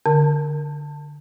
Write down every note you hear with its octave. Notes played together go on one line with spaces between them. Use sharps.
D3